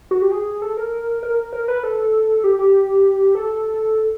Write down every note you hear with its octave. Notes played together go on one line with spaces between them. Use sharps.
F#4
G4
G#4
A4
A#4
A#4
A#4
B4
A4
G4
G4
A4